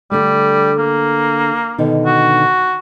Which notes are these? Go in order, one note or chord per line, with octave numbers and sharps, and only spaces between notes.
D3 G3 A3
A#3
B2 D3 D#3
F#4